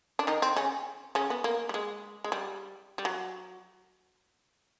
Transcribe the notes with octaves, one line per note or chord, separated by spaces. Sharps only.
D4
D#3 D#4
C4
C#3 C#4
C#3 C#4
B3
A#3
G3
G#3
G#3
G3
G3
F#3